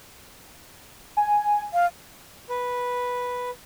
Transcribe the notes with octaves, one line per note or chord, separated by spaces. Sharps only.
G#5
F5
B4